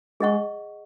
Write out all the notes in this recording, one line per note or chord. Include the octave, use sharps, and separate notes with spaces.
G#3 G#4 D#5 F#5 C#6